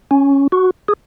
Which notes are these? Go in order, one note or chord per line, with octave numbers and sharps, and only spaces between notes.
C#4
F#4
G#4